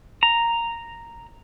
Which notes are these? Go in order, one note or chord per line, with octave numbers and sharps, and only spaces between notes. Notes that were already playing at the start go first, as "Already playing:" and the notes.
A#5